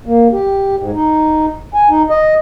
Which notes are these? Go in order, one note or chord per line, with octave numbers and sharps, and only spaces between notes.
A#3
G4
G#2
D#4
G#5
D#4
D#5